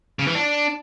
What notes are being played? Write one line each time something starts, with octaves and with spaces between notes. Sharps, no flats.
C#3
E3
D4